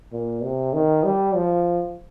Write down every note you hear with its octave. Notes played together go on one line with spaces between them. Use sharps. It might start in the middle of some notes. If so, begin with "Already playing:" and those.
A#2
C3
D#3
G3
F3